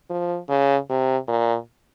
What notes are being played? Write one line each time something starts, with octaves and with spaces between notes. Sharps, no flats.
F3
C#3
C3
A#2